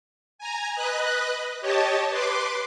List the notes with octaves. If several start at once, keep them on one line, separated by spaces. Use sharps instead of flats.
G#5 A#5
B4 D#5 F#6
G4 C#5 D#5 A5
B4 C6 D6